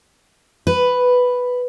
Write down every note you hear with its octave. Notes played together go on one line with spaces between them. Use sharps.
B4